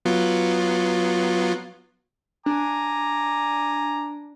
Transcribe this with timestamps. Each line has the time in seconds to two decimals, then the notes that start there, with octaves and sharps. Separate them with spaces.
0.05 F#3 B3 F4
2.46 D4 G#5 A#5 D6